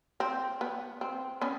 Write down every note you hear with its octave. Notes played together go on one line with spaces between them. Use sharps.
C4
B3
C4
B3 C#4